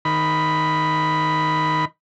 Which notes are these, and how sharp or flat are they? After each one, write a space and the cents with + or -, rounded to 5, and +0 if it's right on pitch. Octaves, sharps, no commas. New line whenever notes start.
D#3 +0 B5 +0